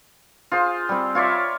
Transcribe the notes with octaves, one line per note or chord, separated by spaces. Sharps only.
F4 G#4 C5
G3 C4
F4 C#5 D5 E5